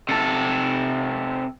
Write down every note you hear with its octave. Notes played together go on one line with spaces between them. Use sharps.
C3 A4